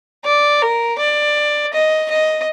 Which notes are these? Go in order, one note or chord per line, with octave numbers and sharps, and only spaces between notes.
D5
A#4
D5
D#5
D#5